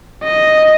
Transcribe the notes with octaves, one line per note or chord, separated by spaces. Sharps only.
D#5